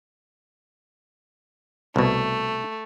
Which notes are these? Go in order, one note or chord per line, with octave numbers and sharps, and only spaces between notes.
C2 B2 A3